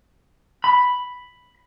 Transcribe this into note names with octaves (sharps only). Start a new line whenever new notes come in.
B5